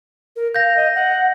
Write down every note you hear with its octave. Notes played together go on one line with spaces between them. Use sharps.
A#4
F5 G6 A#6
D#5
F#5